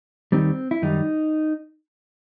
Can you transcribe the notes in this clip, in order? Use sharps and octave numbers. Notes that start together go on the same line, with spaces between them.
D#2 D#3 G3 C4
E4
F#2 D#3 G3 D#4